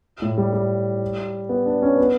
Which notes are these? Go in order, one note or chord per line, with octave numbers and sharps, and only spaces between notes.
A2
G3
G3
B3
D4
C#4
B3